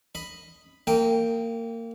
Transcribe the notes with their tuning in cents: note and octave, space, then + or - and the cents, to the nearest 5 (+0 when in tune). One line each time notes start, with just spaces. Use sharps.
D#5 +0 B5 +5
A#3 -25 D#5 +0 G5 +0